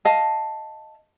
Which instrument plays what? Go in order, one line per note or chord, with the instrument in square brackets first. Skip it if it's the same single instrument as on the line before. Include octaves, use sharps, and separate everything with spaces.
[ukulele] D#5 F5 A5